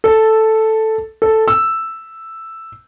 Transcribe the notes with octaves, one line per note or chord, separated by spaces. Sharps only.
A4
A4
E6